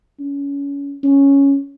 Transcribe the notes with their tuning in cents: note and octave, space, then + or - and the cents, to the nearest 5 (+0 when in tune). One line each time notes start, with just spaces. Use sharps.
C#4 +25
C#4 +0